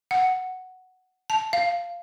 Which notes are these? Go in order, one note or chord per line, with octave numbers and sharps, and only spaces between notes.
F#5
A5
F5